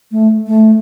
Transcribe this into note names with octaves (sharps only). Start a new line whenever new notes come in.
A3
A3